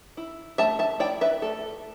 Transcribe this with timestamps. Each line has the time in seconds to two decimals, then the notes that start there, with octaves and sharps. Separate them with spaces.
0.17 E4
0.58 A3 E5 A5
0.79 E5 A5
1.00 E4 D5 G5
1.21 B4 E5
1.42 A3 A4